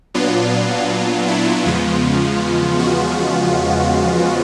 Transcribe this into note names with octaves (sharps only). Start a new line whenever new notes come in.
A#2 F#3 B3 D4 F4
E4
E2 C#3 F3 G#3 B3 F4
F#4